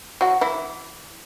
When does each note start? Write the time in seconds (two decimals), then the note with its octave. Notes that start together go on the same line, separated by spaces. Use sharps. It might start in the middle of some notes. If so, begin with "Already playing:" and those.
0.21 F#3 F#4
0.41 E3 E4